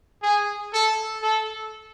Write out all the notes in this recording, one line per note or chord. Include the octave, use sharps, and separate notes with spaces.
G#4
A4
A4